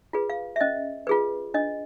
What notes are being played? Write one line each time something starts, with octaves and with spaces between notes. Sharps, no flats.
F4 G#4 B4
F5
E5
C#4 D#5
F4 G#4 B4
D4 D#5